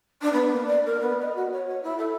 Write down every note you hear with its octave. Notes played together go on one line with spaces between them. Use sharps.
D4
B3
A#3
D5
A#4
B3
D#5
F#4
C#5
C#5
E4
A4